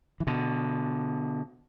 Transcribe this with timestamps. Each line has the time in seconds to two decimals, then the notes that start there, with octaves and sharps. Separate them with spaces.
0.20 E3
0.27 B2 D3